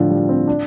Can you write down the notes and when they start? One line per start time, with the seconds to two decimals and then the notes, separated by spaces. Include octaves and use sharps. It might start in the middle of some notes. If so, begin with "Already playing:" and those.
Already playing: A2 D3 F3
0.10 G3
0.29 C4
0.48 D4